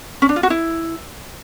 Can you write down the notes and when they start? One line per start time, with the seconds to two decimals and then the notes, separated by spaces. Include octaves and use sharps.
0.22 C#4
0.29 D4
0.36 F4
0.43 F#4
0.50 E4